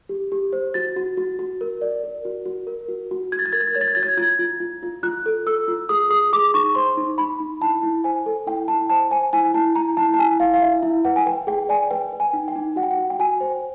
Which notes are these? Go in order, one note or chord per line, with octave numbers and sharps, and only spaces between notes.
G4
G4
C5
F#4 A6
F#4
F#4
F#4
A#4
D5
A#4
F#4
F#4
A#4
F#4
F#4
F#4 G#6
A6
G#6
A#4 A6
G#6
A6
C#5 G#6
A6
G#6
F#4 A6
G#6
F4 G#6
F4
F4
F4
F4 F#6
A4
A4 E6
F4
G#4 D#6
G#4 D#6
G#4 D6
D#4 C#6
C5 C6
D#4
D#4 B5
D#4
E4 A5
E4
C5 G#5
A4
E4 G5
E4 A5
C5 A5
C5 G#5
E4 G#5
E4 A5
E4 A#5
E4 A5
A5
E4 G#5
E4 F5
F5
E4 E5
E4
B4 F#5
G#5
B4 G5
G#4 G5
D5 G#5
B4 G5
B4
G#5
D#4
G5
D#4
F#4 F#5
G5
F#5
F#4
G5
F#4 G#5
C5